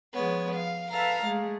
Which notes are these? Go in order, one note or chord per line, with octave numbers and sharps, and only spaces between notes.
F3 G#3 B3 C#5
F5
A4 B4 E5 F5 A#5
G#3 A3 G#4